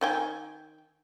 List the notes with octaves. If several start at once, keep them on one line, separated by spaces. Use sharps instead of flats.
D#3 G5 G#5